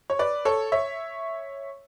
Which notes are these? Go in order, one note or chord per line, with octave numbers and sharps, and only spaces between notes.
C#5
B4 D5
A4 C#5
C#5 E5